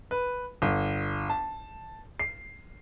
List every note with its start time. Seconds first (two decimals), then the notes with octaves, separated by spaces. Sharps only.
0.11 B4
0.62 G1
1.29 A5
2.19 C7